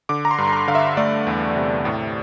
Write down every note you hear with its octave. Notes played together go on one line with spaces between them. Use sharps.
D3 D6
A#5
C6
G2
C6
A#5
D3 F5
E5
A3 D5
E2
C3
A2